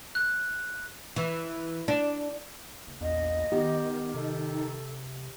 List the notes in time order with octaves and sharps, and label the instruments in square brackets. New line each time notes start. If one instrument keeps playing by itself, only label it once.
[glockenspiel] F#6
[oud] E3
D4
[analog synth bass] F#1
[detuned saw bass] A#1 [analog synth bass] E2 [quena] D#5
[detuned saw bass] D#3 [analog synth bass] B3 [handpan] G4
[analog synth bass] C3 [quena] A4